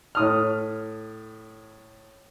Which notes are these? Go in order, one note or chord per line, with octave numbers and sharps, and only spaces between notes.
A2 D#6 F6